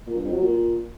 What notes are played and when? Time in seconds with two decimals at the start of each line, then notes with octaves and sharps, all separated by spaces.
0.07 A#2
0.16 G2
0.24 F2
0.33 F#3
0.41 A#2